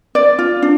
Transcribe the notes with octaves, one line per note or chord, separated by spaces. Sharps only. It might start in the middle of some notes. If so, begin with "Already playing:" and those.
D5
F4
D4